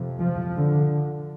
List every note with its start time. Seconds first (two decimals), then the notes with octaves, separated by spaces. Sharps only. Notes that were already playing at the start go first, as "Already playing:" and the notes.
Already playing: F2 C3
0.21 F3
0.55 D3